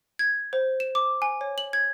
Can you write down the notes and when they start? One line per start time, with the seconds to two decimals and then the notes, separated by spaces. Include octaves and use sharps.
0.19 G#6
0.53 C5
0.80 E7
0.95 D6
1.22 G#5
1.41 C#5
1.58 F#7
1.73 G#6